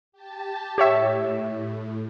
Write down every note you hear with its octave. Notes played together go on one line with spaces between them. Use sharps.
G4 A5
A2 G4 C#5 E5